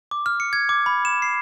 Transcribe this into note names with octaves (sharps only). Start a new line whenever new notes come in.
D6
F6
C#7
G#6
D6
B5
E7
C7